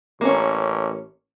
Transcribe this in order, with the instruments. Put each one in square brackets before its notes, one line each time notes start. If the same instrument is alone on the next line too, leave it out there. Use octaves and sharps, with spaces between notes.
[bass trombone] A1 [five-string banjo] A#3 C#4